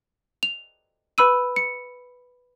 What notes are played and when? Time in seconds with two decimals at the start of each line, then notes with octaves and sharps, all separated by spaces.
0.43 F7
1.18 B4 B5 E6 D#7
1.56 C#7